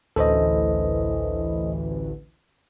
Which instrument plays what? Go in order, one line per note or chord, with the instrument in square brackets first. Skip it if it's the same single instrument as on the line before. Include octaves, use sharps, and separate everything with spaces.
[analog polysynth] A1 D2 E3 [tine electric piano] A4 C5 D#5